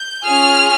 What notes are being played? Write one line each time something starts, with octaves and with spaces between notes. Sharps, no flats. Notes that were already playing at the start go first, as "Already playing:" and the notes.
Already playing: G6
C#4 F4 G#4 F6